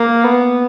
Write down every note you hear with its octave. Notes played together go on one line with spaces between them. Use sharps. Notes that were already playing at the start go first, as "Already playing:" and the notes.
Already playing: A#3
B3